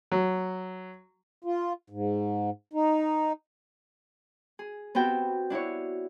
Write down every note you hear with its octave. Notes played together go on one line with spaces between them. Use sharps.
F#3
F4
G#2
D#4
G#4
B3 C4 F#4 G4 G5
D4 E4 F#4 C#5